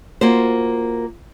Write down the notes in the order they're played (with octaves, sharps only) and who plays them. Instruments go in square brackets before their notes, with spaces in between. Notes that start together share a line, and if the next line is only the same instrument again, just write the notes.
[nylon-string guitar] A#3 F4 F#4 C5